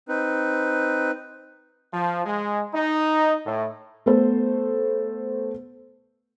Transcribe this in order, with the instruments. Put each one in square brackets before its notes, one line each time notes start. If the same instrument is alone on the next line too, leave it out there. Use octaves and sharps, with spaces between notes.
[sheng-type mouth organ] C4 D#4 B4
[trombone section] F3
G#3
D#4
A2
[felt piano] A3 B3 A4 C5